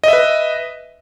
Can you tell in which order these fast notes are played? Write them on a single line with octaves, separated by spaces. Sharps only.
D#5 E5 B4